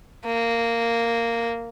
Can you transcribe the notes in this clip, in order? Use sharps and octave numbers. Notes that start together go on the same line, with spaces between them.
A#3